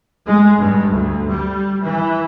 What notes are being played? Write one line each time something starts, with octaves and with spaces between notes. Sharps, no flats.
G#3
G2
D2
G3
E3